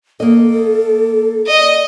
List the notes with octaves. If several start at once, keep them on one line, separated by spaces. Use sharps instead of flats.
A#3 A4 D#5
D5 D#5